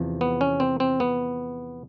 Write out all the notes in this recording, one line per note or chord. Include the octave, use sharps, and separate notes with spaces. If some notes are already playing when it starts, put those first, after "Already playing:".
Already playing: E2 C3 F3
B3
C#4
C4
C4
B3